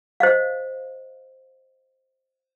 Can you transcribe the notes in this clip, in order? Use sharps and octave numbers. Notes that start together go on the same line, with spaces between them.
C5 D#5 F5